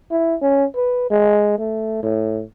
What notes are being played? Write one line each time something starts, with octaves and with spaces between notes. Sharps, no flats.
E4
C#4
B4
G#3
A3
A2